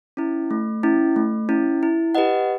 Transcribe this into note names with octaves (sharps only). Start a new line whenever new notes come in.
C#4 E4
A3
C#4 E4
A3
C#4 E4
E4
G4 B4 D#5 F#5